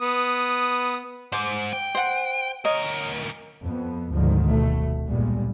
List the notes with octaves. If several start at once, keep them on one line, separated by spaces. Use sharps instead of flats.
B3 D#6
G#2 C5 D6
G5
C5 F#5
D2 A#4 C#5 D#5
F2 B3
G#1 D2 G#2 D3 D#3 F3
F1 B2 A3
B1 G2 A#2 G3 G#3